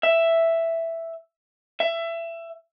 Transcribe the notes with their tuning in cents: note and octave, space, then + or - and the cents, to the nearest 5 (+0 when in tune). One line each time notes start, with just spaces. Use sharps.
E5 +5
E5 +20